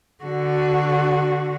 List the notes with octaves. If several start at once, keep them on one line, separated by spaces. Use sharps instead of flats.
D3 F#4